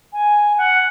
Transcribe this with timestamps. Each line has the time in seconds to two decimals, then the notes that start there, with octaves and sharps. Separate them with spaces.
0.12 G#5
0.58 F#5